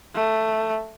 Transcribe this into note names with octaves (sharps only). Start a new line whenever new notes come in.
A3